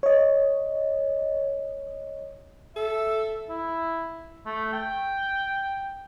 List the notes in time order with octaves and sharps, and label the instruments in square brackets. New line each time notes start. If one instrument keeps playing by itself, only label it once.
[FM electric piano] C#5 D#5
[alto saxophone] A4 [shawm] E5
[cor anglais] E4
A3
G5